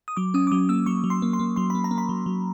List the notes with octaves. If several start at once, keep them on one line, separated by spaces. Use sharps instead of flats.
D#6
F#3 D6
C#4 D#6
D6
F#3 D#6
A#3 E6
F#3 C#6
F#3
C6
A#3
C6
A#3
F#3 C6
A#3 B5
A#5
A#3
B5
F#3
F#3